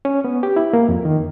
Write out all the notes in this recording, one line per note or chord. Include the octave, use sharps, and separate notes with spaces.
C#4
B3
G4
E4
A#3
F2
D#3